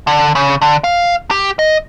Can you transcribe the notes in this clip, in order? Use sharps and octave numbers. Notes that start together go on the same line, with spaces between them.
D3
C#3
D3
F5
G4
D#5